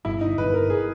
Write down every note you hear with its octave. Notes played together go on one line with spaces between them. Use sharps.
G1 E4
D#4
G1 B4
A#4
G#4